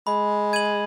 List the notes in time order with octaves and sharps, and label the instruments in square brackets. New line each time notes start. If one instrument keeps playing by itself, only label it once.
[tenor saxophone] G#3 [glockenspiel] B5
[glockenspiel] G#6 D#7 F#7